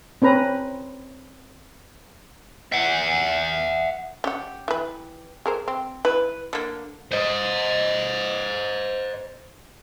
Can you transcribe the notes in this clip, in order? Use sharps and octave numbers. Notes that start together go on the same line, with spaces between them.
C4 C#4 B4 A#5
E5 F#5
C#4 G4 F#5
E3 B4
G#4 A#4 C5
C4
E4 B4
D3 A#3
C5 D#5